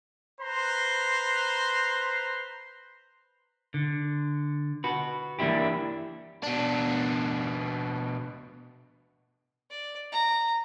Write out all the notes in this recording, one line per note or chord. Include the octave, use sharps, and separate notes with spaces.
B4 C5 A#5 C6
D3
F#4 B4
E3 A#3 D4 E4 G4
B2 D4
D5
A#5